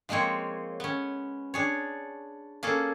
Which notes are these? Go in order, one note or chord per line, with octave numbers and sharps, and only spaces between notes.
F3 G#3 A#3 C4 C#5
B3 C#4
D4 G#4 C#5
A#3 C#4 G#4 A4